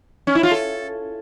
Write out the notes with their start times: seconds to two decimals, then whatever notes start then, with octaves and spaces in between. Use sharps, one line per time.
0.27 C#4
0.35 E4
0.43 F4
0.51 A4